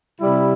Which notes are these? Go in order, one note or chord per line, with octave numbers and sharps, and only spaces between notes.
C3 G3 E4